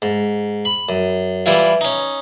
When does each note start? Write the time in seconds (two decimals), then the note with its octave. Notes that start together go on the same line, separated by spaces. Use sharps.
0.02 G#2
0.65 B5
0.89 F#2
1.46 E3 G3 E4 F4
1.81 C#4 D#4